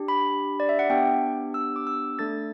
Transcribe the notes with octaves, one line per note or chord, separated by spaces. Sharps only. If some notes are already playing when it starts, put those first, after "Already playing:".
Already playing: D4 G4
B5
D5
E5
F#5
B3 D4 G4 G5
E6
D6
E6
A3 D4 A4 A6